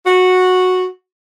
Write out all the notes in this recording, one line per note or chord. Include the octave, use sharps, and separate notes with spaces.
F#4